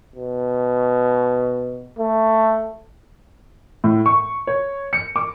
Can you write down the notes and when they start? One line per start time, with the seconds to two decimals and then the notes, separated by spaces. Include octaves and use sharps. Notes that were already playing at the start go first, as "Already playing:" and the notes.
0.16 B2
1.98 A3
3.84 A2
4.06 C#6
4.47 C#5
4.93 C#7
5.16 D6